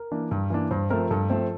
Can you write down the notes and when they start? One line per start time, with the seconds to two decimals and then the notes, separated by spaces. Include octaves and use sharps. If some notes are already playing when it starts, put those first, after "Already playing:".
Already playing: A#4
0.11 E3 A#3 D4
0.31 G2
0.50 E3 A#3 D4
0.71 G2 C5
0.90 F3 A3 C4 A#4
1.11 G2 A4
1.30 F3 A3 C4